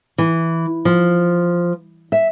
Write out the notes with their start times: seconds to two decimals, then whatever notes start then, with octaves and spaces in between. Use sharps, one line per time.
0.18 E3
0.85 F3
2.12 E5